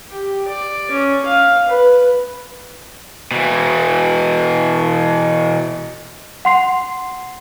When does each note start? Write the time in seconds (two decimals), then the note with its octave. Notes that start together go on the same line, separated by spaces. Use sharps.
0.11 G4
0.48 D5
0.91 C#4
1.26 F5
1.69 B4
3.31 B2 E3
6.45 F#5 C6 C7